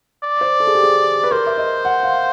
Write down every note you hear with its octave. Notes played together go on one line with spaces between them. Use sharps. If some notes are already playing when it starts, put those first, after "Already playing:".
D5
C5
A4
G#4
G4
G#4
B4
A#4 C5
E5
D#5
F#5
F5